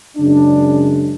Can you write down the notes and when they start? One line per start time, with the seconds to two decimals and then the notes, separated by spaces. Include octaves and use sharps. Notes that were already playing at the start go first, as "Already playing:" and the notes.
0.17 F#2 C#3 G#3 D4